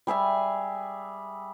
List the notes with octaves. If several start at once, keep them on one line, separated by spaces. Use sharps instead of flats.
G3 G#4 E5 G#5